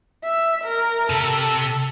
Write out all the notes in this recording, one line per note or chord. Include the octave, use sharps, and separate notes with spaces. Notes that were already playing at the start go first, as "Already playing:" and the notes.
E5
A#4
C3 A4